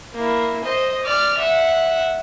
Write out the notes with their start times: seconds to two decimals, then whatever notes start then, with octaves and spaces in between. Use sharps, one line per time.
0.14 A#3 E4
0.64 C5 D#5
1.03 D5 F6
1.38 E5 F#5